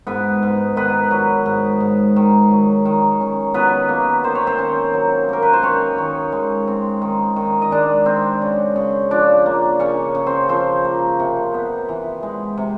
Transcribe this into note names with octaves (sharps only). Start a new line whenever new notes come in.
G#2 B3 B4
G#2
D#3 B3 B4
F#3
G#2
G#2
D#3
F#3
D#3
C#4
F#3 B3 B4
A#3
D#3 C5
C#5
C4 C5
C#4
F#3
A#3 A#4
B4
C5
D#3 C#4 C#5
D#3
G#3
C4
D#3
D#3
D#5
G#3 D4 D5
C4
C#3
C#3
F3 D4 D5
A#3
C#3 C#4 C#5
C#3
C4 C5
F3 C4 C5
A#3
C3
B3
E3
G#3
C3